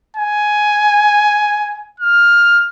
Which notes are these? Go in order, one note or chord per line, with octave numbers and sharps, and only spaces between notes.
G#5
F6